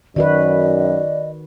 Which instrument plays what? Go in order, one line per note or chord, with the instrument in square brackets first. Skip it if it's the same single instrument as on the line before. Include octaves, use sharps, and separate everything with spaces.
[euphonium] F#2 [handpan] D#3 F#4 B4 [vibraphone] D5 [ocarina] D#5